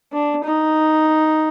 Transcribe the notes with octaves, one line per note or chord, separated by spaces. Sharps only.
D4
D#4